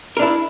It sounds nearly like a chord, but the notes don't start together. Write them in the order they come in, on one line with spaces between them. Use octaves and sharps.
A#4 D4 E4